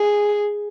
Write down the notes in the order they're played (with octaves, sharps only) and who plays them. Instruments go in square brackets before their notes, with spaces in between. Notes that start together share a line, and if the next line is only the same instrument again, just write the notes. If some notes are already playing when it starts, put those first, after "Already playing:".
Already playing: [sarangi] G#4